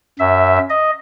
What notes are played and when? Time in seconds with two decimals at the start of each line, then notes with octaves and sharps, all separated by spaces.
0.19 F#2 E5
0.70 D#5